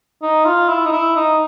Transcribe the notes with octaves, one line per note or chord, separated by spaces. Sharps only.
D#4
F4
E4
D#4
E4
D#4